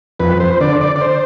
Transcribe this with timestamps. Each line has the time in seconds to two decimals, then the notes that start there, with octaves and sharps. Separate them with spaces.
0.20 F2 B4
0.40 C5
0.60 D3 D5
0.81 D5
0.96 D5
1.01 C5